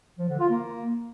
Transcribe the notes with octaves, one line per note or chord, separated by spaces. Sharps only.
F3
D3
F4
A#3